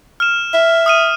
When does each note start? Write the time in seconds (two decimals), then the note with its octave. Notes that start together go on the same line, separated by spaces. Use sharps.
0.20 F6 E7
0.54 E5
0.86 D#6 F6 D#7